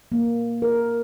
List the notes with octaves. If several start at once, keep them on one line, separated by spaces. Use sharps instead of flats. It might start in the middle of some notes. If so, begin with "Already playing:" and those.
A#3
A#4